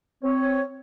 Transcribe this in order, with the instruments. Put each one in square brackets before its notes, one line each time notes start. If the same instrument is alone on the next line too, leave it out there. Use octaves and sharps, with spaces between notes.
[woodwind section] C4 C#5